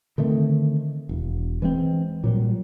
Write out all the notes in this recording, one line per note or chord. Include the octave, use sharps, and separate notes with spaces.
D3 D#3 A3 C4
E1
E3 G#3 A#3 C4
A#2 F#3 G3